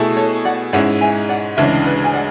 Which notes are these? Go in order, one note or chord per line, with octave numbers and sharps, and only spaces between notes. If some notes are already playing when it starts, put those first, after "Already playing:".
Already playing: B2 A3 E4 G#4
A4 C#5
D5 F#5
G#2 G#3 C#4 E4 D5 F#5
E5 G#5
D5 F#5
D2 C#3 E3 G#3 D4 C#5 E5
B4 D5
G#5
D5 F#5